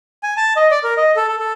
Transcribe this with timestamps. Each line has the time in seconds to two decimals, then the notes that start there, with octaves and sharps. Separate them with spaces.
0.23 G#5
0.37 A5
0.56 D#5
0.71 D5
0.84 A#4
0.97 D#5
1.16 A4
1.28 A4
1.39 A4